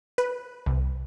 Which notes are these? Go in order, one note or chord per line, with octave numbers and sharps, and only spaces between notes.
B4
C2